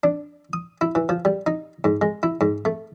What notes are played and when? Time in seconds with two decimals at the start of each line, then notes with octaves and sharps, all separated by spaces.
0.04 D4
0.53 D#6
0.81 E4
0.95 E3
1.09 F3
1.25 G3
1.46 D#4
1.84 G#2
2.02 G#3
2.23 E4
2.41 G#2
2.65 A3